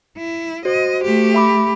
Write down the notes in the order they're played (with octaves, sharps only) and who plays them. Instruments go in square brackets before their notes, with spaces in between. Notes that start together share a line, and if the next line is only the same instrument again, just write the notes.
[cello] E4
[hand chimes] F#4 C5 [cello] D#5
[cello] A3 G4
[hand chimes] E5 B5 D6